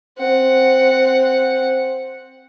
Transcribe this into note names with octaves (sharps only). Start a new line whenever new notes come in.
C4 F#5